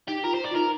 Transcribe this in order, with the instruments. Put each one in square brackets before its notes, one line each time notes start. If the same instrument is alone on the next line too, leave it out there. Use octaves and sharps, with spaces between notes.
[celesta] D#4 [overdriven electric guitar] G4
[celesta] F4 [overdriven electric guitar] A#4
[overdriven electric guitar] C5
D5
[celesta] F4
[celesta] D#4 [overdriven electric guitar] A#4